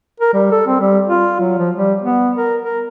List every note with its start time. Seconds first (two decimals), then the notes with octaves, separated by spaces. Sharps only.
0.20 A#4
0.34 G3
0.52 A4
0.67 C4
0.80 G3
1.08 F4
1.41 F#3
1.59 F3
1.76 G3
2.02 B3
2.37 A#4
2.62 A#4